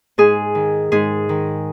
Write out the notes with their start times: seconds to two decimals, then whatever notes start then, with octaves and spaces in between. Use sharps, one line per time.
0.18 G#2 G#4
0.55 D#3
0.92 G#2 G#4
1.29 D#3